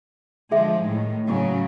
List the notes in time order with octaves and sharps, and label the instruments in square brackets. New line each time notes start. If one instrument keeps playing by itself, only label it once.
[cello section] D3 F3 G#3 [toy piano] G#4 E5
[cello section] A2 D#3
A2 C#3 F#3